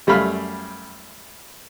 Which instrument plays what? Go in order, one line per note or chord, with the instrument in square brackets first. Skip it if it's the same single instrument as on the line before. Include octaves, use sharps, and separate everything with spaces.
[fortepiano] F#2 G3 A3 F5 B5 F6